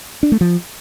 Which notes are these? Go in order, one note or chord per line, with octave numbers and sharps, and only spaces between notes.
D4
A3
F3